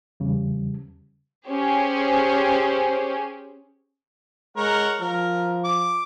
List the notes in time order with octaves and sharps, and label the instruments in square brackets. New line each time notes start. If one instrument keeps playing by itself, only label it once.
[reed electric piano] E2 C#3 G3
[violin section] C#4 G4 G#4 C5
[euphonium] G#3 [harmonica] A#4 C#5 F#5
[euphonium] F3 [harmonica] A#4
[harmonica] D6